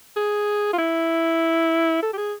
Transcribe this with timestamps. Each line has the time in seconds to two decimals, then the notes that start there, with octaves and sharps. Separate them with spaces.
0.16 G#4
0.73 F4
0.78 E4
2.02 A4
2.13 G4
2.17 G#4